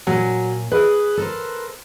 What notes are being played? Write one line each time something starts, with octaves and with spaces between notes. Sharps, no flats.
A#2 F#3 A#4 G#5
G#4 B4
A4 A#4 C5